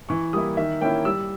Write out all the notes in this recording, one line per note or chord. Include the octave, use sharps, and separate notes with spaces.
E3 C#6
G3 A#3 E4 D#6
D#3 E5
A#3 C#4 E4 G5
G3 E6